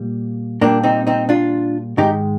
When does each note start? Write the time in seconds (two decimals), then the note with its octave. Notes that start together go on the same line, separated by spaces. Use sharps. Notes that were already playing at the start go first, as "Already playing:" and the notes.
Already playing: A#2 G3
0.61 A#2 G3 A#3 D4
0.83 C4 D#4
1.07 C4 D#4
1.29 D4 F4
1.97 G#2 D#3 G#3 D#4 G4